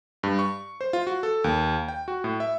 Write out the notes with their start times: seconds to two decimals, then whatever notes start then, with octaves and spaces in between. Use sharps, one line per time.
0.23 G2
0.39 C#6
0.81 C5
0.93 F4
1.07 F#4
1.23 A4
1.44 D#2
1.88 G5
2.08 F#4
2.24 A2
2.40 E5